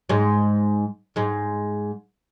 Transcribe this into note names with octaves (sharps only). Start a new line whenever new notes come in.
G#2 G#3
G#2 G#3